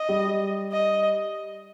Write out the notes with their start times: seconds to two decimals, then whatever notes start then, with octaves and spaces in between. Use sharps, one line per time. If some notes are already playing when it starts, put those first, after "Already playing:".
Already playing: D#5
0.09 G3
0.72 D#5